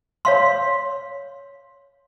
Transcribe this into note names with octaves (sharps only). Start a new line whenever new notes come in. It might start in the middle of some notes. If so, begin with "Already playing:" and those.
C#5 F5 C6